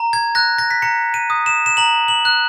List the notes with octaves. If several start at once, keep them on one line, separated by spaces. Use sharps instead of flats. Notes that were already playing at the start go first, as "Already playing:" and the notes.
Already playing: A#5
G#6
F#6 A#6
A#6
B6
A#5 C#7
D#7
D#6
E7
E7
A#5 F#7
F#7
F#6